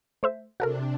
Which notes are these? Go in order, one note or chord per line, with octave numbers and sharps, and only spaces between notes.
A3 C5 E5
C3 D4 F#4 A4 A#4